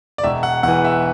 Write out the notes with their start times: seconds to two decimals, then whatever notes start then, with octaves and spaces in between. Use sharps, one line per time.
0.18 D5
0.23 E1 E5
0.43 F#5
0.63 E2 F#5
0.68 E3
0.84 E5